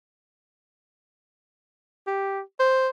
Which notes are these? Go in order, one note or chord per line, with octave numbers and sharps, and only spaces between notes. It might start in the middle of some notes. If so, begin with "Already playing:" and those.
G4
C5